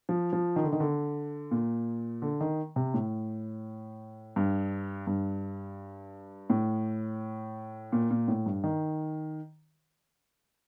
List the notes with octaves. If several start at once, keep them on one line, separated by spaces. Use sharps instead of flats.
F3
F3
D#3
D3
D#3
D3
A#2
D3
D#3
C3
A2
G2
G2
A2
A#2
A#2
A2
G2
D#3